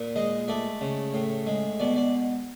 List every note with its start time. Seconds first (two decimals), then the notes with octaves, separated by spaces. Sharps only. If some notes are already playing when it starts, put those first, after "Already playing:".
Already playing: A#2
0.16 G#3 D#5
0.48 A3 D5
0.81 C#3
1.14 A2
1.47 G#3
1.80 B2 D5
1.96 D5